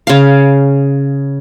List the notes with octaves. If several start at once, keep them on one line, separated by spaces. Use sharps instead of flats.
C#3 F5